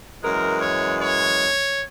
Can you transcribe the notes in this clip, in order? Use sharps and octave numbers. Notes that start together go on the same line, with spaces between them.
F#2 E3 G#3 A#4
C#5
C#5